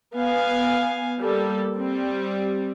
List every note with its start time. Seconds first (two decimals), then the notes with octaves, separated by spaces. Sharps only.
0.15 B3 F5 G#5
1.21 G3 A#3 A4
1.76 G3 C4